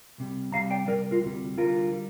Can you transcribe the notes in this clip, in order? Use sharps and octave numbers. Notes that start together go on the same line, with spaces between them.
C2 C3 G3
C2 C3 G3 F5 A#5
D5 G5
C2 A#2 G3 A#4 D5
F4 A#4
D2 C3 G3
D2 D3 G3 F4 A#4
G3